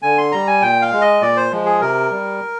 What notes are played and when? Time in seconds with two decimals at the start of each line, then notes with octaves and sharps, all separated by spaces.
0.02 D3 G#5
0.18 C6
0.32 G3 A#5
0.47 G#5
0.62 A#2 G5
0.82 F5
0.92 G#3
1.01 D#5
1.21 A#2 D5
1.37 C5
1.51 F3 G#3
1.66 G#4
1.81 C3 A#4
2.11 G3